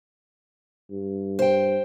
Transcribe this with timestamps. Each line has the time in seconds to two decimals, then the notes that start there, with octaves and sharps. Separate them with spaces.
0.91 G2
1.39 C5 G5